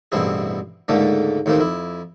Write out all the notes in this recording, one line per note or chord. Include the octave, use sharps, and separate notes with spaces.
A1 G2 B2 C4 E4 G#4
C#2 G#2 D3 A3 A#3
D#2 A2 D#3 A#3 C4
F2 E4